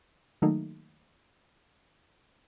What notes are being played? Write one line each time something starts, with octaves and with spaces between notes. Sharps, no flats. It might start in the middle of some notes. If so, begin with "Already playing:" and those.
D#3 F#3 A3 A#3 D#4